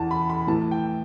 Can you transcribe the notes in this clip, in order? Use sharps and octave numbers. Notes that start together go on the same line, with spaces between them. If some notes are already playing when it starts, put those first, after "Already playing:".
Already playing: E2 E3 A5
B5
B5
A2 E3 A5
G5